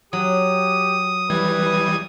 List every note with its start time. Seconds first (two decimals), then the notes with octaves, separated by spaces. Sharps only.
0.13 F#3 G4 D#6
1.30 E3 G3 B4 G#6